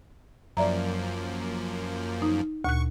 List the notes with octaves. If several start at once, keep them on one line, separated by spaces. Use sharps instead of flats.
F#2 F3 A#3 D5 E5 A#5
D#4
D2 A#2 C#6 F#6